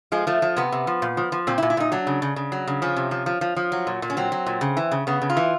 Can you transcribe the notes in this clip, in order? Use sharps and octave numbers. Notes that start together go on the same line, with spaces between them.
F3 G#3
F3 A3
F3
C3 B3
C3
F3
A#2
F3
F3
A#2 C4
E4
A#2
E4
A#2 D#4
F#3 D4
C#3
C#3
C#3
F#3
C#3
F3 C#4
C3
F3
F3
F3
F3
F#3
A#2
A#2
C#4
F#3 C4
F#3
A#2
C#3
E3
C#3
C#3 B3
C#3
F4
E3